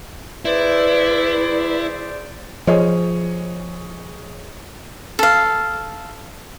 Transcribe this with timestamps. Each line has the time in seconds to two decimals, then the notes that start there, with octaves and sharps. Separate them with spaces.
0.45 E4 G#4 B4 C5 D5
2.67 F3 G#4 C#5 D#5
5.19 A4 F5